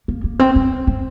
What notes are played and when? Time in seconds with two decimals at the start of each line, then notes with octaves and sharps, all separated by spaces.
0.08 A#3
0.24 A#3
0.39 C4
0.56 C4
0.87 C4